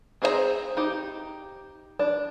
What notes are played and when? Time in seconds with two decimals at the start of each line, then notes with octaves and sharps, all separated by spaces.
0.22 C4 G#4 C5 D#5 A#5
0.77 D#4 G4
1.99 D4